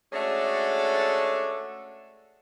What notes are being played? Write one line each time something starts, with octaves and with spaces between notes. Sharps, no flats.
G#3 A3 C#4 D4 F#4 A4